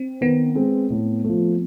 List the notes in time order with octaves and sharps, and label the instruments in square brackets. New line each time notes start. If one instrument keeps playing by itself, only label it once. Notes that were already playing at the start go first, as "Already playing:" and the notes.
Already playing: [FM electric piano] C4
[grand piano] D#3 [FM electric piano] B3
[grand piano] G#3 C4
A2
F3 A3